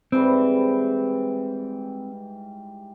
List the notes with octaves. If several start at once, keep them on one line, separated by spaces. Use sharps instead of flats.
G#2 E3 G3 C4